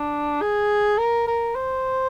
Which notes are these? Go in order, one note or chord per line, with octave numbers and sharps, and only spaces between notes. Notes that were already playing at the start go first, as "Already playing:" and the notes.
Already playing: D4
G#4
A#4
A#4
C5